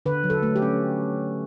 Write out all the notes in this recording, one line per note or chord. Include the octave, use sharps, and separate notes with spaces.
D3 B4
F#3
A4
A3
G4
C#4